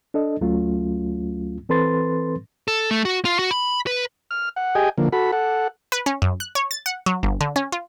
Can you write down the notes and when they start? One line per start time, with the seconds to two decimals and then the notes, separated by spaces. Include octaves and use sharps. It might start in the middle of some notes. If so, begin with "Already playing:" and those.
0.14 D4 A4 D#5
0.41 D2 F#3 A3 C#4 F4
1.69 E3 C4 A4 B4 C6 A6
2.68 A4
2.91 A3
3.05 F#4
3.25 F4
3.39 F#4
3.51 B5
3.87 B4
4.31 F6
4.56 F#5
4.75 G4 G#4 D#5 G5 G#5
4.98 D3 F3 A#3
5.13 F#4 A4 B5
5.32 A4 F#5
5.92 B4
6.06 C#4
6.22 F#2
6.40 F#6
6.55 C#5
6.71 A6
6.86 F#5
7.06 F#3
7.23 G1
7.41 D3
7.56 C#4
7.72 F4